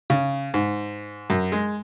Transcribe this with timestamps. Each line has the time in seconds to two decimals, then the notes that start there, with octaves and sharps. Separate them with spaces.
0.10 C#3
0.54 G#2
1.30 F#2
1.52 G#3